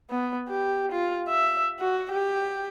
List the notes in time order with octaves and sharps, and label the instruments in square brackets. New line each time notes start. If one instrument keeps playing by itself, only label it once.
[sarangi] B3
G4
F4
E5
F#4
G4